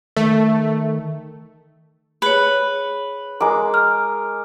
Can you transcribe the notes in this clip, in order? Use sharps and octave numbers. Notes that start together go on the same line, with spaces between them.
D#3 A3
G#4 B4 C#5
G#3 A#4 D6
F6